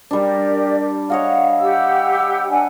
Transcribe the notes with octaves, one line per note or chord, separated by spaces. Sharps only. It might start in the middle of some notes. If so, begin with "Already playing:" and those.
G3 D4 G4 A#4 D5
C#5 D#5 F5 F#5
G4 F#5 E6
D4 F#5 G#5